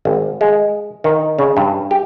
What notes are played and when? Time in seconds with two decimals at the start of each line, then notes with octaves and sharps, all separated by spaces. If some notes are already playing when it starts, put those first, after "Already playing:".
0.05 G#1
0.41 G#3
1.04 D#3
1.39 C#3
1.57 G2
1.91 G4